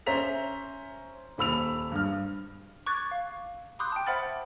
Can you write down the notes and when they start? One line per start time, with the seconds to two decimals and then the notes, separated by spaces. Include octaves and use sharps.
0.06 C#4 C5 E5 A#5 B6 F7
1.38 D#1 B5 E6 F7
1.92 G2 F6
2.86 C#6 D6 F#6 G#6 A6
3.11 F5
3.79 B5 C6 D6 D#6 F#6 G6
3.92 G5 A5
4.07 C5 E5 F#5 B5 F6 A6